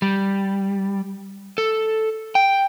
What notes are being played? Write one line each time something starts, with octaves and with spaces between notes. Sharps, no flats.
G3
A4
G5